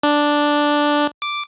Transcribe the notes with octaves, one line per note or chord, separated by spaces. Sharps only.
D4
D6